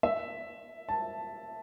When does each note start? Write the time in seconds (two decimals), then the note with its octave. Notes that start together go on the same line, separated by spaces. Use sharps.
0.03 E5
0.89 A5